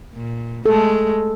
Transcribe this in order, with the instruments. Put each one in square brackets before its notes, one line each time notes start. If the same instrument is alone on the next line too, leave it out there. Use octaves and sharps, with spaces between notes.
[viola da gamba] A#2
[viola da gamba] G#3 A3 [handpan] A4